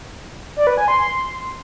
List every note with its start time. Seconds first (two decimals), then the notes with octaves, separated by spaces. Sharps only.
0.56 D5
0.67 B4
0.77 G#5
0.88 C6